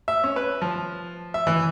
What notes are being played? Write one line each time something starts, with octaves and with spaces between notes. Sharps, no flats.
E5
C#4
B4
F3
E5
E3